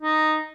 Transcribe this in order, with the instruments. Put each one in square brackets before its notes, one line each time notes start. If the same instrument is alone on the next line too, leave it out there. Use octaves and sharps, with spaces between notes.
[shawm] D#4